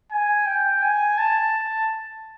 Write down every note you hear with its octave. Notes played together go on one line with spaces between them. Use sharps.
G#5
G5
G#5
A5